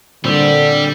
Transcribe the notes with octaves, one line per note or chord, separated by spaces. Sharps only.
A#2 D3 G3 C4 E6